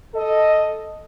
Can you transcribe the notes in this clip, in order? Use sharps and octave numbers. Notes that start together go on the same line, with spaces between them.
A4 D#5